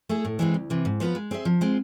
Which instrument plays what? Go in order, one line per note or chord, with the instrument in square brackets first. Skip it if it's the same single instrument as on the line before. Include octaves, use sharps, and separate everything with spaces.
[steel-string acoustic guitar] A3 E4 G#4
A2
E3 G#3 C4
D2
C3 E3
G#2
F3 B3 F4 B4
G#3
C4 G#4 C5 E5
F3
G#3 C4 F4